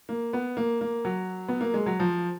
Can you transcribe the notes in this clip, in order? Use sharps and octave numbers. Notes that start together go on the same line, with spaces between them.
A#3
B3
A#3
A#3
F#3
B3
A#3
G#3
F#3
F3